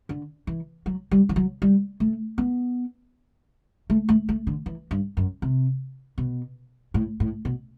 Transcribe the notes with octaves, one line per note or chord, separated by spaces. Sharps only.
D3
E3
F#3
G3
E3
F#3
G3
A3
B3
A3
A3
A3
D3
E3
G2
F#2
C3
B2
A2
A2
B2